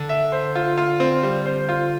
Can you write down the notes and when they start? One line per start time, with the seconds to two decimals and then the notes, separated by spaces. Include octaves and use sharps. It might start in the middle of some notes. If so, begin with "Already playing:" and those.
Already playing: D3
0.09 E5
0.32 C5
0.55 F4
0.77 F4
1.00 C4
1.23 G3
1.46 C5
1.69 F4